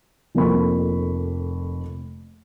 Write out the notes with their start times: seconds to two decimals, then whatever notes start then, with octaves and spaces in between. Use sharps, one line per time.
0.35 F1 F2 A#3 B5 C#6